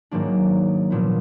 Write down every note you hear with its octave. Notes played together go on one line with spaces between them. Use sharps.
G#2 D#3 F#3 A#3 D4
A#2 F3 B3